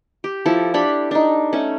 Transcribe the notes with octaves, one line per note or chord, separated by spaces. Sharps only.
G4
F3 E4 A4
D4 G4 A4 B5
D4 D#4
A3 C#4